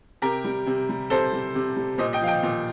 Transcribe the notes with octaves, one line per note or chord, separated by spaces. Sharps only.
C3 G4 A#4
G3
C3
G3
C3 A4 C5
G3
C3
G3
A#2 C5 D#5
D#5 G5
F3 F5
D#5 G5
A#2